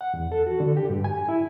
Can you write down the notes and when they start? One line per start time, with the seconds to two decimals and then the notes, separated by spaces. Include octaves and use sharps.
0.01 F#5
0.14 E2
0.32 A4
0.47 F#4
0.60 D3
0.77 G4
0.90 G2
1.04 G#5
1.29 E4